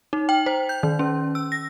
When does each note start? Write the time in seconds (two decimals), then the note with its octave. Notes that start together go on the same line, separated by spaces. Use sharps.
0.13 D#4
0.29 G5
0.46 C5
0.69 G6
0.83 D#3
0.99 C#4
1.35 E6
1.52 A#6